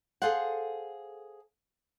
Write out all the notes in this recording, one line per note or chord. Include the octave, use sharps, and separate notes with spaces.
G#4 A4 C5 F5 F#5